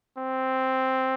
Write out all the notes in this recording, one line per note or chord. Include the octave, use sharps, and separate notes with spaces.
C4